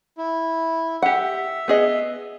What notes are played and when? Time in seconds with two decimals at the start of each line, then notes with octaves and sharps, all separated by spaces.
0.18 E4
1.02 G4 E5 F#5
1.68 B3 G#4 D#5